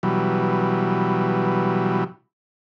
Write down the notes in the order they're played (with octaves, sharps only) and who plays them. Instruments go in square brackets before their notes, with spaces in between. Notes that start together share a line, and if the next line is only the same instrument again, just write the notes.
[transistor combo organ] B2 E3 F#3 G3